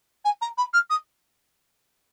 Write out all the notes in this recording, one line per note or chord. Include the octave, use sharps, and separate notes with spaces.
G#5
A#5
B5
F6
D#6